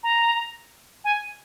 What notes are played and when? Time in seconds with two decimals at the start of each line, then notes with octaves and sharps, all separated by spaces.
0.03 A#5
1.04 G#5